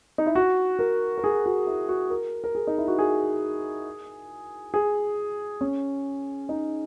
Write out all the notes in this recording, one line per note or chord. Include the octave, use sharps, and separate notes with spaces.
D#4
E4
F#4
A#4
A#4
G#4
F#4
E4
F#4
A#4
A#4
G#4
D#4
E4
F#4
G#4
G#4
C#4
D#4